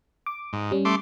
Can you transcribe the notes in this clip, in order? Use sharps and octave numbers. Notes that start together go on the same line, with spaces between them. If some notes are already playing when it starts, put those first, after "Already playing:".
D6
G#2
G3 C#4
A3 C6 D6